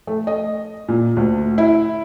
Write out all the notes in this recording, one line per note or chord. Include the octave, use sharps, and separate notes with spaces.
A3
D#5
A#2
D2
E4